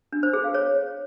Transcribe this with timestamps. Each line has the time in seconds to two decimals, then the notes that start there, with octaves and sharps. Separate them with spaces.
0.12 D4
0.23 C5
0.33 G#4
0.44 F5
0.54 C#5